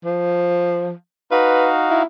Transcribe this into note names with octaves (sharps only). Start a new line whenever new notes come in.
F3
D#4 F#4 B4 F5
E4